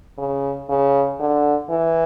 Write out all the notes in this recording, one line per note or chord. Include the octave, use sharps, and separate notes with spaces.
C#3
C#3
D3
E3